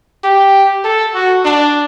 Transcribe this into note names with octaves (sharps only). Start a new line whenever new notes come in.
G4
A4
F#4
D4